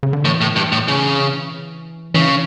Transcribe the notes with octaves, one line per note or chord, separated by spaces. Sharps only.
C#3
D3
A2 E3
A2
G2
A2
C#3
C#3 E3